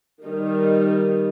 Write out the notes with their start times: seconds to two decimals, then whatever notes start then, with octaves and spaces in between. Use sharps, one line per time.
0.25 D#3 G3 D#4